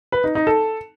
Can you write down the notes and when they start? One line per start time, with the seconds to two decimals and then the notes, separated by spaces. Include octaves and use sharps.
0.12 B4
0.24 D#4
0.35 D#4
0.47 A4